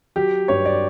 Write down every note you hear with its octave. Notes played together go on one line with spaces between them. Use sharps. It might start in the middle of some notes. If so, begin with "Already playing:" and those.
F#3 G4
G2 C#5
D5